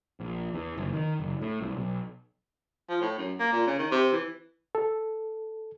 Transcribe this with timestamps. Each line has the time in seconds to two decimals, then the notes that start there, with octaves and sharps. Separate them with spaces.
0.20 A#1
0.53 E2
0.77 F#1
0.93 D#3
1.20 F#1
1.42 A2
1.61 C2
1.77 B1
2.89 F3
3.01 A2
3.18 F#2
3.40 A#3
3.53 A#2
3.67 C#3
3.79 D#3
3.91 C3
4.12 E3
4.75 A4